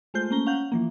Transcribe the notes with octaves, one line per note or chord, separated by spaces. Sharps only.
G#3 A3 F4 C5 G6
A3 A#3 C#4 A#5 G7
C#4 F5 F#5 G6
E3 F3 A#3